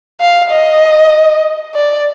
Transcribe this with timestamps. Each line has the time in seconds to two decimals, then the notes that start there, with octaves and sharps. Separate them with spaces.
0.20 F5
0.51 D#5
1.75 D5